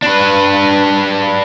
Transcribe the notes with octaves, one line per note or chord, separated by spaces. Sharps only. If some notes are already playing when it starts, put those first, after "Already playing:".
D4 B4